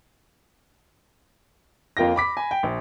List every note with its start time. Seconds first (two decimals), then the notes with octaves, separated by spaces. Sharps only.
1.97 F2 A#3 F4 G5 A#6
2.16 B5 D6 B6
2.37 G#5 B5
2.51 G5
2.63 A#1